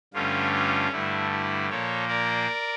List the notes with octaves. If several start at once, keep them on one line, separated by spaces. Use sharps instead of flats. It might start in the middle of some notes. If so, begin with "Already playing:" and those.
G2 D3 A3 C#4 F4
F4
G2 D3 A3 E4
E4
A#2 F3 A#3 A4 C#5
A#4 D5